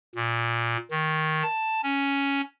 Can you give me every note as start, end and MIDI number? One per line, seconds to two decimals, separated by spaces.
0.15 0.77 46
0.91 1.43 51
1.43 1.81 81
1.83 2.41 61